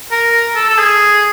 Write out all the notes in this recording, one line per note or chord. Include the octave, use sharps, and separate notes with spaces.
A#4
A4
A4
G#4